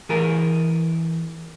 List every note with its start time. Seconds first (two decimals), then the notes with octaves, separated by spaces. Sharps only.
0.09 E3 G#4 A#4